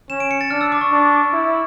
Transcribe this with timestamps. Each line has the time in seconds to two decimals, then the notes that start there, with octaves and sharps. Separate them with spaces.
0.10 C#4 E7
0.20 D7
0.31 C#7
0.41 A6
0.50 D4 F6
0.61 E6
0.72 D6
0.81 C#6
0.92 D4
1.33 E4